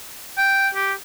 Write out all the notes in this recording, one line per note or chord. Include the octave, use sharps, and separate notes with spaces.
G5
G4